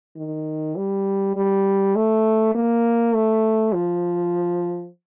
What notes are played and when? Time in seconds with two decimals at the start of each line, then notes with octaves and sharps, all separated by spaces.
0.16 D#3
0.76 G3
1.36 G3
1.95 A3
2.55 A#3
3.13 A3
3.73 F3